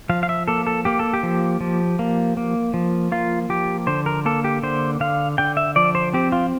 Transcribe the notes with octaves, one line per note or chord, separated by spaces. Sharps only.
F3 F5
F5
E5
A#3 A4
A4
A#3 G4
A4
G4
F3
F3
A#3
A#3
F3
A#3 F4
F3 G4
D3 C5
A#4
A#3 A4
G4
D3 C5
D3 F5
D3 G5
E5
F3 D5
C5
C4 G4
F4